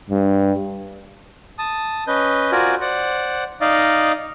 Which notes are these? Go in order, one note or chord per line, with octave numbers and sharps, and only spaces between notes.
G2
A5 D#6
C#4 B4 D#5 G6
F4 F#4 A#4 C5 D5 G#5
C5 D5 F#5
D#4 D5 D#5 F5